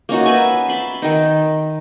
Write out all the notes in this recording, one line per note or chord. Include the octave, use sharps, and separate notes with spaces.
A#3 C#4 D#4 F#4
B4 E5 G#5
E5 A5 B5 C6
D#3 D#4